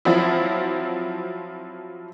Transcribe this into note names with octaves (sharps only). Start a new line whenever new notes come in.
F3 F#3 C4 E4